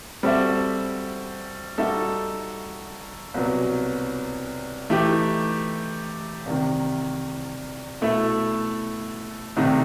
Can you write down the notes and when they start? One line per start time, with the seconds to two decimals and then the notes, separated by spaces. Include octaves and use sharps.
0.23 G3 C4 F#4 A4 E5
1.78 G3 D#4 F#4 A4 E5
3.34 C2 B2 F#3 B3
4.90 E3 A3 D#4 G4
6.46 C2 C3 D#3
8.01 B2 A3 E4 A4
9.57 C2 C3 D#3 A3 D#4